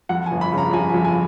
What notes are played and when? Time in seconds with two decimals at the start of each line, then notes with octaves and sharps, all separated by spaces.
0.09 F2 F#5
0.26 G#5
0.32 G1
0.41 B5
0.52 C#3
0.58 A#5
0.73 F3 G#5
0.89 G#5
0.94 F2
1.05 G#5